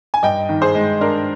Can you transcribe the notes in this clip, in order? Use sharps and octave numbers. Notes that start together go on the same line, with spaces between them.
G#5
G2 D#5 G5
D#3
G#4 C5
G#3
D4 A#4